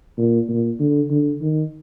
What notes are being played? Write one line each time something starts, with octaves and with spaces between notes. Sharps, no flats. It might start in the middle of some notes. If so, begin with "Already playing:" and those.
A#2
A#2
D3
D3
D#3